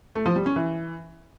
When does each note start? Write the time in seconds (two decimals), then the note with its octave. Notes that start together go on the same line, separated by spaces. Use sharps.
0.15 A3
0.26 F3
0.36 G3
0.46 C#4
0.56 E3